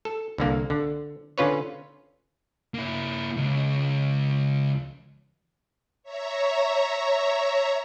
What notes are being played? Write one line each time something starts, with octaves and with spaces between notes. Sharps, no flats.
A4
C2 D3 A#3
D3
D3 C#4 F4 B4 C#5
A#3 E4
C#2
C#5 E5 A#5